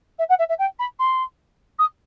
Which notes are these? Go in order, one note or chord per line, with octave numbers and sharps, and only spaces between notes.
E5
F#5
E5
E5
G5
B5
C6
D#6